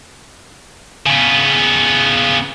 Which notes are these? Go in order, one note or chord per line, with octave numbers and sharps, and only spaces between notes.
C#3 B3